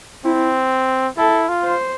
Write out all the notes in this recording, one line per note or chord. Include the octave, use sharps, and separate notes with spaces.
C4 E4
E4 A4
F4
C5